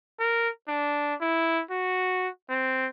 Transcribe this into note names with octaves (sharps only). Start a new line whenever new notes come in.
A#4
D4
E4
F#4
C4